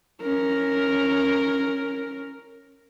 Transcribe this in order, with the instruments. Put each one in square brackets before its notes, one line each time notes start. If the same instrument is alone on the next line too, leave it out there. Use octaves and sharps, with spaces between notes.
[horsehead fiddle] C#4 A#4